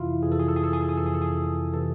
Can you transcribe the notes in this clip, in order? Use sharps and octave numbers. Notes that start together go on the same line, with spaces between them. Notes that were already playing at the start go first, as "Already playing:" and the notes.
Already playing: F2 C3 E3 E4 F4
F2 C3 E3 G#4
A4
G#4
A4
G#4
A4
G#4
A4
G#4
F2 C3 E3 A4
G#4
A4
G#4
C3 E3 A4